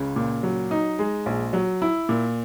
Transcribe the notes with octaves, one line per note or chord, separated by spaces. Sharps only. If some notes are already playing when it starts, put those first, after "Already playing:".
Already playing: C#2 C#3
A#2
F#3
D#4
G#3
A#1
F#3
E4
A#2